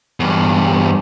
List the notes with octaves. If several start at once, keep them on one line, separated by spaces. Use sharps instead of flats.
E2 G2